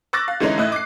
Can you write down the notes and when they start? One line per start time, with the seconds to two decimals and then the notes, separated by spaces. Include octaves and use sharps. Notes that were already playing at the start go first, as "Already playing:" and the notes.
0.13 C#6 D6 E6 F#6 A6 A#6
0.28 F5
0.40 D3 E3 G#3 C#4 D#4
0.58 A2 E4 D#5 F#6
0.72 D6 C7